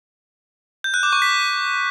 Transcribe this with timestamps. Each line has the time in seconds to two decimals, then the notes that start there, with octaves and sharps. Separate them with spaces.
0.84 G6
0.94 F#6
1.03 D6
1.13 C#6
1.22 B6